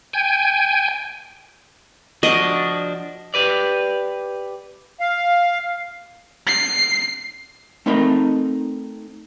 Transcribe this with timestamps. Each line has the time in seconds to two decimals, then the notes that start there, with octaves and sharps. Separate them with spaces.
0.13 G5 G#5
2.23 F3 D4 F#4 D#5
3.34 G4 B4 D5
5.00 F5
6.48 C7
7.86 A3 C4 D#4 A#4 D#5 B5